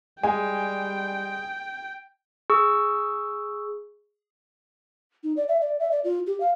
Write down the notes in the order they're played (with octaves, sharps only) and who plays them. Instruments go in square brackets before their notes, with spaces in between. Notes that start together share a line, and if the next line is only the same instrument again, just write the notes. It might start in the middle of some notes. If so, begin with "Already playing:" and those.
[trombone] G3 [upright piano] G#3 [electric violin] G5 [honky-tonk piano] G#5
[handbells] G#4 C#6 E6
[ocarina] D#4
D5
E5
D5
E5
D5
F4
G4
F5